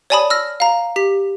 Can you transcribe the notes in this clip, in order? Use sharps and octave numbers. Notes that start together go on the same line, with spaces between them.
C#5 D5 G#5 A5 B5 D#6
E6 F6 A#6
F5 A#5
G4 B6